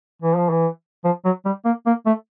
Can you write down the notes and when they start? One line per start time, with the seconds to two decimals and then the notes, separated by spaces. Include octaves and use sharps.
0.22 E3
0.36 F3
0.50 E3
1.04 F3
1.25 F#3
1.45 G3
1.65 A#3
1.86 A#3
2.06 A3